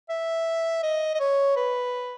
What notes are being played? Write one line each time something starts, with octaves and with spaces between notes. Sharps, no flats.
E5
D#5
D#5
C#5
B4